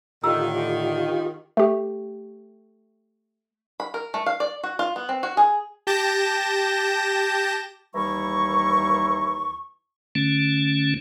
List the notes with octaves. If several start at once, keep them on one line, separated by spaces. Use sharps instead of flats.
A2 D3 D#3 F4 G4 A#5 E6
A3 G4
B5
A#4
A3
F5
D5
F#4
F4
B3
C4
F#4
G#4
G4 A5 G6 A#6 E7
D#2 E3 G3 E4 A#5 C#6
D3 A3 C#4